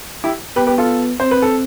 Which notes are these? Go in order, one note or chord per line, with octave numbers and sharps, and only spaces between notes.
E4 G4
B3 G4 B4
G4 B4
F4 A4
C4 C5
B4
A4